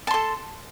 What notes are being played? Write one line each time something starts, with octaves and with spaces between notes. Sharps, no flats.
A4 A5 C6